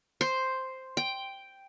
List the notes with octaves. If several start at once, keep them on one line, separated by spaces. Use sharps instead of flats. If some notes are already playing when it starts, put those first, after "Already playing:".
C5
G5